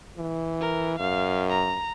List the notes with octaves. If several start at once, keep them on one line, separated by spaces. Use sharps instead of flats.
E3
A#4
F#2 F5
A#5